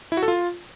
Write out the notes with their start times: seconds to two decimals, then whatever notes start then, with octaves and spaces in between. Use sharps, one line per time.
0.12 E4
0.17 F#4
0.23 A4
0.28 F4